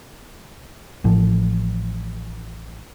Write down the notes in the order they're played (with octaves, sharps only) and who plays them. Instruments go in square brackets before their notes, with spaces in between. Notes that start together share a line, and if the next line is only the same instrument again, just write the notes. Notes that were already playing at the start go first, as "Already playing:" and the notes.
[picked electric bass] A1 A2 F3